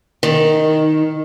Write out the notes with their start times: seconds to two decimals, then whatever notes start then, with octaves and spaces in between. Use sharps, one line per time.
0.23 D#3